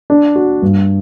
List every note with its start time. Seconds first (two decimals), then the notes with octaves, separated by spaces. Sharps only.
0.10 D4
0.36 F#4
0.62 G2